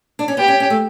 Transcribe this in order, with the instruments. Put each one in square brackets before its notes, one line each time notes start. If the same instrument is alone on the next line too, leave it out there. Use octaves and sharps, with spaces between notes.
[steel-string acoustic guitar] D4
C#4
[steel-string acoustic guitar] B3 [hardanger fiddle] G4
[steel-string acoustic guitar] C#4
C#4
A3